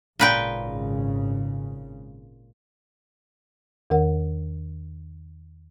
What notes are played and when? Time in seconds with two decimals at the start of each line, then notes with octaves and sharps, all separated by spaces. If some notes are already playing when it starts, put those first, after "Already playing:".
0.19 G#1 A#2 C#3 B4 G5
3.90 E2 D#3 A#4 F#5